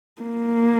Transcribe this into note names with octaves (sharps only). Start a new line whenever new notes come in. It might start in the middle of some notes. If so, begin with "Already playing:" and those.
A#3